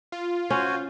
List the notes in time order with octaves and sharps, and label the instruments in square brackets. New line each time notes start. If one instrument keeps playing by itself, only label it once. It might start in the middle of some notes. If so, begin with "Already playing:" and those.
[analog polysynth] F4
[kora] C#4 [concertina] F#4 C5 G#5